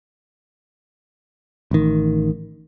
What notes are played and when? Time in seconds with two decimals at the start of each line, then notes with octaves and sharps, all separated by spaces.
1.71 A1 D#3